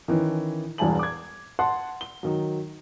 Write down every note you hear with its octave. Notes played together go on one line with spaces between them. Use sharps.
D#3 E3 C#4
E1 E2 G2 G#5 A5 F#7
D6 G#6
F#5 A5 C6
G7
D#3 F#3